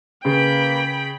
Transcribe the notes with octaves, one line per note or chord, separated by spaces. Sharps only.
C#3 A#3 B4 G5 B5